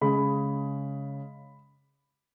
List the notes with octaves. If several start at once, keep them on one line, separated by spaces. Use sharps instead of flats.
C#3 G#3 B5